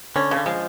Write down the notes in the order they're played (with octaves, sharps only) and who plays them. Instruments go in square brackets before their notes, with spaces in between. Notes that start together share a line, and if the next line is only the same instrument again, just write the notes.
[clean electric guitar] D3 [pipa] C#4
[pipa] C#3
[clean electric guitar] D3
[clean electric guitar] F3 [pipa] G#3